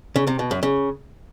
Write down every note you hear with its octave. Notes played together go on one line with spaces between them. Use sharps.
C#3
C3
B2
F#2
C#3